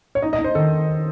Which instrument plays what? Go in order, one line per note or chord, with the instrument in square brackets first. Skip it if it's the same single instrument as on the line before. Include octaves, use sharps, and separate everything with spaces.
[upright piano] C#5
[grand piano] D#4 [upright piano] D#5
[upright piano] D#5
[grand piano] D#4
[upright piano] C5
[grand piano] D#3 [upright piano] A4